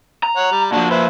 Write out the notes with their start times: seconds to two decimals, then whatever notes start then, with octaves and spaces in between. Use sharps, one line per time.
0.23 A#5
0.37 C#5 F#5
0.52 G3
0.72 A#2 F3 D4 F#4 A5
0.90 B4 C5 E5